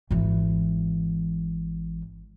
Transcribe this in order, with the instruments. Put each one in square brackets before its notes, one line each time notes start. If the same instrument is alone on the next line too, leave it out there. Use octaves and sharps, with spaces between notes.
[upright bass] G#1 E3